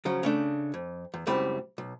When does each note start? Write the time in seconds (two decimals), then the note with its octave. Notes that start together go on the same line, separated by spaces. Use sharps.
0.05 C#3 F3 F#3
0.23 C#3 A3 D4
0.74 F2
1.14 E2
1.27 C#2 F#2 G3 C4 E4 B5
1.78 B1